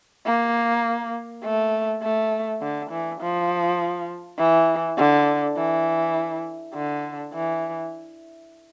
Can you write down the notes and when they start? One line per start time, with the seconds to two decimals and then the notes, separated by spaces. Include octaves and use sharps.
0.26 A#3
1.44 A3
2.03 A3
2.61 D3
2.91 E3
3.21 F3
4.38 E3
4.98 D3
5.57 E3
6.75 D3
7.33 E3